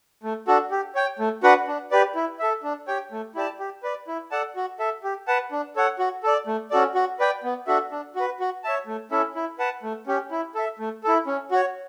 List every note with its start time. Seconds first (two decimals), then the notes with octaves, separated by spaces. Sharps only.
0.23 A3
0.47 D4 F#4 A4
0.71 G4
0.95 C#5 G5
1.19 A3
1.43 D4 F#4 B4 F#5
1.68 D4
1.91 G4 B4 D5
2.15 E4
2.39 A4 E5
2.63 D4
2.87 G4 C#5 G5
3.12 A3
3.35 E4 G4 D5 A5
3.59 G4
3.83 B4 D5
4.08 E4
4.31 A4 D5 F#5 A5
4.56 F#4
4.79 A4 E5
5.04 G4
5.27 B4 F#5 A5
5.52 D4
5.76 A4 C#5 F#5
5.99 F#4
6.23 A4 D5
6.47 A3
6.71 C#4 F#4 A4 D5
6.95 F#4
7.19 B4 D5 G5
7.44 B3
7.67 D4 F#4 A4 E5
7.91 D4
8.16 F#4 B4
8.40 F#4
8.64 C#5 E5 A5
8.87 A3
9.11 C#4 E4 A4 E5
9.35 E4
9.59 B4 F#5 A5
9.83 A3
10.07 C#4 G4
10.31 E4
10.55 A4 E5
10.79 A3
11.04 E4 A4
11.27 C#4
11.51 F#4 C#5